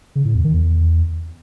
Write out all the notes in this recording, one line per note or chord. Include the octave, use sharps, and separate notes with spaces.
C#3
A2
E2
D#3
E2